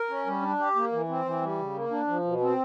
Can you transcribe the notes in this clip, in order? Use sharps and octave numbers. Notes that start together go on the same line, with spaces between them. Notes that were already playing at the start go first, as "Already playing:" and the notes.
Already playing: A#4
C#4
G3
D4
G4
A#3
E3
C4
E3
G3
C#3
A#3
D4
F3
B2
C4